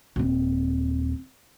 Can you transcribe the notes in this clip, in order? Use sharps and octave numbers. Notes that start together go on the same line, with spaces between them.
D#1 C4